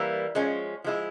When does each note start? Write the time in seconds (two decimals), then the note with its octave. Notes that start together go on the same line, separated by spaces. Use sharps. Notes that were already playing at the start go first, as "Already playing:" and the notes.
Already playing: E3 G3 A#3 E4
0.35 F3 G#3 C#4
0.84 F3 G#3 E4